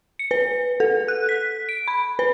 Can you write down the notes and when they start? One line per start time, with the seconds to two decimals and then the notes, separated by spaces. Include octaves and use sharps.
0.19 C#7
0.31 B4
0.80 A4
1.08 F#6
1.29 B6
1.69 D7
1.88 B5
2.19 B4